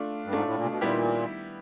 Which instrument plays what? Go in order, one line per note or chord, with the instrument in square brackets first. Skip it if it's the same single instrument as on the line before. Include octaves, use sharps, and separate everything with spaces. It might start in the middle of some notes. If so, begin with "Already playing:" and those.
Already playing: [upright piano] A3 D4 F4
[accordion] G2
[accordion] G#2 [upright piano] A3 D4 F4
[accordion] A2
A#2
C3
B2
[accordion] A#2 [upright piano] D#3 G3 B3 E4 G4